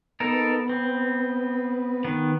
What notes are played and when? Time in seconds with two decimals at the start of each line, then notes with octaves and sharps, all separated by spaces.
0.20 B3 D#4 A4 A#4
0.69 C4
2.04 D#3 B3